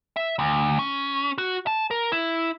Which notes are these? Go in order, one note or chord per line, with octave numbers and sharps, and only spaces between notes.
E5
D2
C#4
F#4
A5
A#4
E4